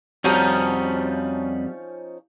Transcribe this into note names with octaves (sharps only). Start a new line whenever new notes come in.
F2 F3 G3 C#4 D#4 F#4